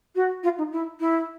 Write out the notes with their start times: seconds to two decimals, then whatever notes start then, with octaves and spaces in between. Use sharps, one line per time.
0.15 F#4
0.43 F4
0.58 D#4
0.72 E4
1.00 E4